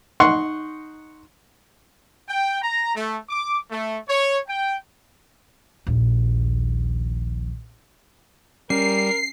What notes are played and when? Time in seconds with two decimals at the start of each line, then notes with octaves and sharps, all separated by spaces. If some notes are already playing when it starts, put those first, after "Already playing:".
0.20 D#4 F#5 C6 C#6
2.29 G5
2.62 A#5
2.95 A3
3.29 D6
3.71 A3
4.09 C#5
4.48 G5
5.87 A#1 D#2
8.70 G3 C#4 A#4 C7